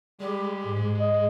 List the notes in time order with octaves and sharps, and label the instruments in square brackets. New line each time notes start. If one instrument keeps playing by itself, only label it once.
[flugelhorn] G3 [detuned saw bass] G#3 [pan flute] G4
[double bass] G#2
[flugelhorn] D#5